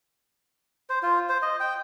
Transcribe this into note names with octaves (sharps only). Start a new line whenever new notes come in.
C5
F4
C5
D#5
G5